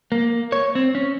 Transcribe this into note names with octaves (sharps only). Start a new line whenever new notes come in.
A#3
C#5
C4
C#4